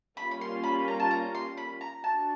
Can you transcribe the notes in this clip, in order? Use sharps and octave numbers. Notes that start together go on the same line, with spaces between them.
G3 A#3 C#4 F4 B5
B5
C6
B5
A#5
A5
A#5
C6
B5
A#5
D4 F#4 A5